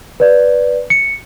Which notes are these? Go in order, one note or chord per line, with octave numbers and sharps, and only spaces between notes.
B4 D5
C#7